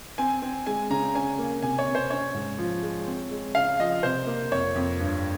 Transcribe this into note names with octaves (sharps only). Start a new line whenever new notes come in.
C4 G#5
C4
G#3 G#5
C#3 A#5
C#4 G#5
A#3
C3 G#5
C#5
C3
C5
C#4 C#5
G#2
F3
G#3
C4
G#3
C#3 F5
F3 D#5
C3 C5
A#3
F2 C#5
F2
G2